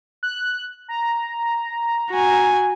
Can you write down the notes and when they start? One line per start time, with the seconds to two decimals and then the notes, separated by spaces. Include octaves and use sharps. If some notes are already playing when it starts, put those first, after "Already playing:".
0.23 F#6
0.88 A#5
2.11 F#4 G#5